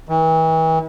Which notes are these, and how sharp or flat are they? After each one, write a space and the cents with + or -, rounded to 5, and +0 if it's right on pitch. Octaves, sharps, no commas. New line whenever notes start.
E3 -40